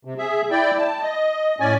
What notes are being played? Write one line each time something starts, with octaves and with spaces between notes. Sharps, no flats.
C3
G#4 E5
E4 D5 G5
A5
D#5
A2 C#4 D5 G#5